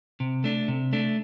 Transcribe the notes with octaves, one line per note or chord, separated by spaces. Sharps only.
C3
A3 D4
C3
A3 D4